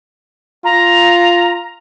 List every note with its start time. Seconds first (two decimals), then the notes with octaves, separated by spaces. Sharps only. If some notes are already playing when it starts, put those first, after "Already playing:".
0.65 F4 A#5